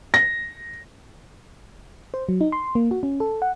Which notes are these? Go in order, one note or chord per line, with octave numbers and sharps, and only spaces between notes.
A#6
C5
F#3
D#4
C6
A#3
F#4
C#4
A4
F#5